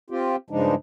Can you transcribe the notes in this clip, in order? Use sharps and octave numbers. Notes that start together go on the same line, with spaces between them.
C4 F4 G4
G2 C#3 F3 G#3 D4 D#4